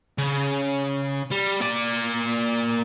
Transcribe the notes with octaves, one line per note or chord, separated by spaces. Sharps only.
C#3
G3
A#3 D5